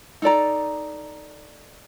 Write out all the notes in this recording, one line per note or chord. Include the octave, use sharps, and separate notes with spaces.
D#4 A4 D5 A#5